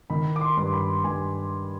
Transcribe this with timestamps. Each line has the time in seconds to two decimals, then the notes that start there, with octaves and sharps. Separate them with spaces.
0.10 D#3 B5
0.36 D6
0.41 C6
0.57 G2
0.73 B5
1.04 G2 G#5